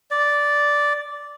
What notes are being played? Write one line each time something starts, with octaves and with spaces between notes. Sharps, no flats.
D5